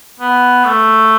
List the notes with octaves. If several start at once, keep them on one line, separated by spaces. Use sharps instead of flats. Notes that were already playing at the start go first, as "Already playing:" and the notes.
B3
A3